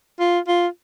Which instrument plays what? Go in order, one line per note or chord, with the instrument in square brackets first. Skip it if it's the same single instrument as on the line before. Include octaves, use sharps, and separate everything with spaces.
[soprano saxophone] F4
F4